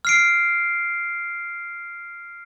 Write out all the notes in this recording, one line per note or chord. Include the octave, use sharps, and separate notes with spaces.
F6 C7 D7